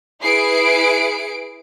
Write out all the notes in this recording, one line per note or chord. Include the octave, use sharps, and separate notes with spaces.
E4 G#4 B4 C7 D7